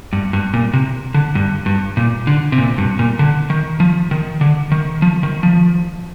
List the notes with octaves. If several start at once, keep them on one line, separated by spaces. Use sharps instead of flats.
G2
G2
A#2
C3
D3
G2
G2
A#2
D3
C3
A#2
G2
A#2
D3
D#3
F3
D#3
D3
D#3
F3
D#3
F3